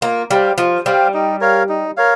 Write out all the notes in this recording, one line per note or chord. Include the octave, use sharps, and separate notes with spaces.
A#3 F4
G3 C5 F5
F3 F4
G3 C5 F5
D#4
A#4 C#5 F5
D#4
A#4 C#5 F5